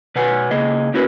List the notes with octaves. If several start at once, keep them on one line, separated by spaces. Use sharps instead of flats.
B2 B4 C#5 F#5 G#5
C#3 A#3 G#4 D#5
A#3 C#4 E4 F#4 A#4 B4